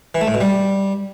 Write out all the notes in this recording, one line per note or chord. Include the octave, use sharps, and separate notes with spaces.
E3
A3
A2
B2
G3